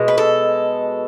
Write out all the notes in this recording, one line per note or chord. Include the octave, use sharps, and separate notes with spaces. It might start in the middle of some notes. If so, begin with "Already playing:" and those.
Already playing: B2 G#3
B4
A4